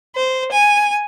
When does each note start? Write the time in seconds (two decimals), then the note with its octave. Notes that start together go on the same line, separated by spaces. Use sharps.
0.16 C5
0.51 G#5